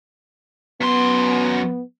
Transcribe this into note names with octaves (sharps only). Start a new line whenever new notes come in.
F#2 B3 C6